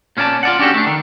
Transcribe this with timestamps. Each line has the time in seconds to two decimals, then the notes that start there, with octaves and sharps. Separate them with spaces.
0.17 A#2 C#4 G4 D5 A5
0.43 F4 D5 F#5
0.59 C#4 D4 F#4 G4 A4
0.74 A3 D4
0.87 D#3